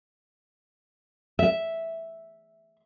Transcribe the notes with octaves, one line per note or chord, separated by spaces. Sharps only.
E5